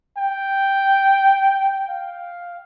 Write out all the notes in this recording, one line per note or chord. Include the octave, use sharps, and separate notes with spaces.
G5
F5